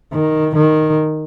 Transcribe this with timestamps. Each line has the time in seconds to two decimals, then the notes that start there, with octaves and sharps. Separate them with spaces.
0.13 D#3
0.56 D#3